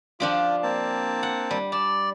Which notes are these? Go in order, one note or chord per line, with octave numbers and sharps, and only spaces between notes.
F3 D4 F4 G4
A#3 C4 A5
F#5
G3
D5 A5